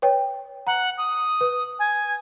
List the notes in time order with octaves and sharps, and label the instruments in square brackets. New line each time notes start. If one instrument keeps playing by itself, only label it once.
[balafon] B4 C#5 G5
[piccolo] F#5 [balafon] A#5
[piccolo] D#6
[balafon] B4
[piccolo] G#5